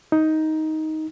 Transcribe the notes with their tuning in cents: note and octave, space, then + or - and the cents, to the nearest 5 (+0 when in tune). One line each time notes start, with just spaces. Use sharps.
D#4 +10